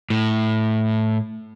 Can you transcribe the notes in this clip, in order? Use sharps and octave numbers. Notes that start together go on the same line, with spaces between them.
A2